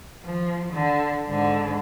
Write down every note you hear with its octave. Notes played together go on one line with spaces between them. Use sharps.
F3
D3
G#2 D3